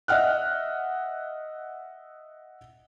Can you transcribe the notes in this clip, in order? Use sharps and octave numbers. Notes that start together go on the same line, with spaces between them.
D#5 E5 F#5 F6 F#6